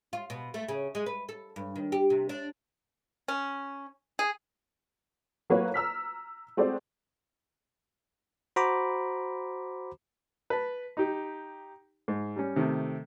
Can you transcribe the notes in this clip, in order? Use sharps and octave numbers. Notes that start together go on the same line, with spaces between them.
F4
B2
A3
C#3
G#3
B4
A4
G2
D#3
G4
C3
D4
C#4
G#4
F#3 A3 A#3 F#4 B4 C#5
A#5 E6 F6 B6
G#3 A3 C4 F#4 C5 D5
F#4 C5 A#5 B5 D6
B4 A5
D#4 G4
G#2
G3 C#4
C3 D#3 A3